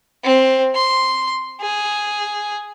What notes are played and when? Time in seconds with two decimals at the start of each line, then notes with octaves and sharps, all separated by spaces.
0.24 C4
0.75 C6
1.61 G#4